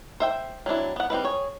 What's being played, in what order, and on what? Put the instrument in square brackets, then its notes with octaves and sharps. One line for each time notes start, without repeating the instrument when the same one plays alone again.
[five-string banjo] C5 E5 G5
F#3 C4 D4 E4
B3 F#5
G3 C4 E4 B4
G#4 C#5